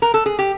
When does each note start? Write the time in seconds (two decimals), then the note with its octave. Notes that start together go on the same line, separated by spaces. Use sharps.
0.02 A#4
0.14 A4
0.26 G#4
0.39 G4